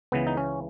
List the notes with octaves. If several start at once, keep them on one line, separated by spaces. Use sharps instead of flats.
C#2 C#3 E3 B3
D#4
C#4